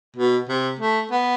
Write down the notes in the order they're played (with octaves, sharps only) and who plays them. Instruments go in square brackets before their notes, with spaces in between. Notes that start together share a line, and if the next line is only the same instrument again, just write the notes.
[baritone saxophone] B2
C3
A3
B3